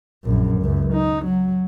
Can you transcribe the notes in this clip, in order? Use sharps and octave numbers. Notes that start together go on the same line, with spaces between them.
A#1 F#2
C#2 F#2
D#4
F#3